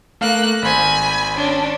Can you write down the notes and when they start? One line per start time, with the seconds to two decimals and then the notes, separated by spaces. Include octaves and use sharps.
0.21 A3 A#3 F5 F#6
0.62 G#1 C5 G#5 B5
1.36 C#4 D4